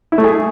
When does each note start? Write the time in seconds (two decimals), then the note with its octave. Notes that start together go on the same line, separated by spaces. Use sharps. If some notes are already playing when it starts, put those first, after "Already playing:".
0.12 E4
0.18 A3
0.24 G#4